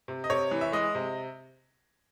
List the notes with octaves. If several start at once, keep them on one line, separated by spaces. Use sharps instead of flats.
C3
D#5
C3 C#5
E3
E5
G#3 D#5
C3